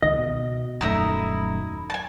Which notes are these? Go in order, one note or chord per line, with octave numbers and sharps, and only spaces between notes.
C#2 D#3 D#5
B2
D#1 F#2 A3 D#4 E4 A#5
G#5 A5